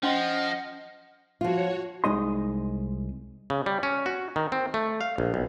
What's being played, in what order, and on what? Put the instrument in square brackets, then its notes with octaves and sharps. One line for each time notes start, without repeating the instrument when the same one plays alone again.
[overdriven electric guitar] F3 [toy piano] C#4 G5 C6 [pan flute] D#5 [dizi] F#5
[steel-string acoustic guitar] F3 F4 [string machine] F#4 C#5
[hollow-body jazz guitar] C2 G#3 D#4 D#5 C6
[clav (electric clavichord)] C#3
G3
C#4
F#4
D#3
C4
A3
F5
A#1
B1